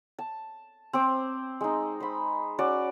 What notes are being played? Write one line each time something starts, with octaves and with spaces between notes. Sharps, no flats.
A5
C4 C5 D6
G#3 D#4
C5 B5
C#4 F#4 D5